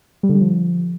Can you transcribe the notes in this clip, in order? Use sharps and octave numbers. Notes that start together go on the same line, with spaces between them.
G3
D3
G3
F3